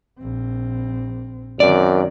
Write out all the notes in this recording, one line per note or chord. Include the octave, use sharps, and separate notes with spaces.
A#1 C4
F#2 D#3 C4 D5